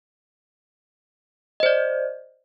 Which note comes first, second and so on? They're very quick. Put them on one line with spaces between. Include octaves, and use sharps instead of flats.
D#5 C5 D5